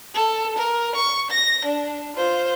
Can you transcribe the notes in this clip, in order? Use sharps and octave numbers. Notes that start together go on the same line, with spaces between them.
A4
A#4
C#6
A#6
D4
F4 C5